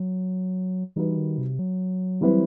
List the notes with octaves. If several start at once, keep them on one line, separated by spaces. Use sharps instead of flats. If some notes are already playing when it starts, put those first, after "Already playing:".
Already playing: F#3
E3 G3 D#4 F#4 B4
D#3
C3
F#3
E3 G3 C4 E4 B4